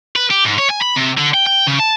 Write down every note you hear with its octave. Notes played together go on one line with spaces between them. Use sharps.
B4
G4
G#2
C#5
G#5
B5
C3
D3
G5
G5
C#3
A5